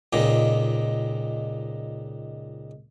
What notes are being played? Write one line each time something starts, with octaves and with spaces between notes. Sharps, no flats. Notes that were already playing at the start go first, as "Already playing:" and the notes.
C#2 A#2 D#3